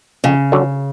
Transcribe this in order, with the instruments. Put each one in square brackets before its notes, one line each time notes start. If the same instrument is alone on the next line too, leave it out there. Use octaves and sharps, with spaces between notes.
[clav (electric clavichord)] F2 [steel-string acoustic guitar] C#3
[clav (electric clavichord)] D3 F#3